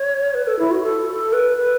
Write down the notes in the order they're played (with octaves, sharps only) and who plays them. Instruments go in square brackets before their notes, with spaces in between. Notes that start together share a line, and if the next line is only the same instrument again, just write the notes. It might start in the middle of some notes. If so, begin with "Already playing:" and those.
Already playing: [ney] C#5
B4
A4
E4
F#4
A4
A4
B4
B4